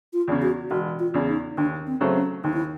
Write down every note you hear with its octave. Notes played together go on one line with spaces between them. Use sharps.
F4
E2 C#3
F#4
E1 F#4
F4
E2 C#3
D#4
D#2 D4
C4
C#3 F#3 A3 C4
C#4
D#2 D#4
E4